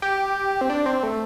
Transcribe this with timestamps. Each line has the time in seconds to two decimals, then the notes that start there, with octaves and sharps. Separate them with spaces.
0.02 G4
0.61 C4
0.70 D4
0.86 C4
1.03 A3